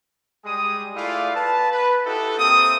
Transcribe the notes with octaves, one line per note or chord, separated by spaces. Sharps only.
G3 G#3 G#4 D#6
A3 E4 F4 G#4 D5 F5
B4 A5
B4
D#4 E4 F#4 G4 A4
A#3 C4 E5 D#6